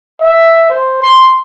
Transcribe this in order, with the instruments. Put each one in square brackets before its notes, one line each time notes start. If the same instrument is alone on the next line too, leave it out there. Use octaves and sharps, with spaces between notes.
[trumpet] E5
C5
C6